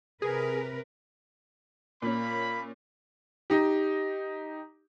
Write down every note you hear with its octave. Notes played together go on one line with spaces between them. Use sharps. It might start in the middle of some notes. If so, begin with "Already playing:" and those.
C3 G#4 A#4 B4
A#2 A#3 C#4 B5
D#4 G4